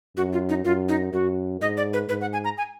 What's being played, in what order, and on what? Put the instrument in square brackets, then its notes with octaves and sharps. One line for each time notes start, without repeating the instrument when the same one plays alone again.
[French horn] F#2 [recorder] F#4
[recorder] F4
D#4
[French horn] F#2 [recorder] F4
[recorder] D#4
[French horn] F#2 [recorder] F#4
[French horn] G#2 [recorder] D#5
[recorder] D5
B4
[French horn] G#2 [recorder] B4
[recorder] F#5
G#5
A#5
G#5